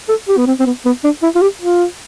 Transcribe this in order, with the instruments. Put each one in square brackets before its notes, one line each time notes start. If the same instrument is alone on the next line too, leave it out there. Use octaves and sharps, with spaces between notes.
[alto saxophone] A4
G4
B3
C4
C4
B3
B3
D4
E4
F4
G4
F4